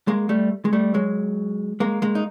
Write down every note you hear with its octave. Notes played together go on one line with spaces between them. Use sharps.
G#3 A#3
G3 A3
G#3
G3 A3
F#3 G#3
G#3 A#3
G#3 A#3
D#4